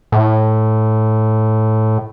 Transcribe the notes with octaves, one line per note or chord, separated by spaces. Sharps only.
A2